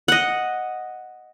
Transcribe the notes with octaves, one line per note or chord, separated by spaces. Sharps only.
D#5 F#5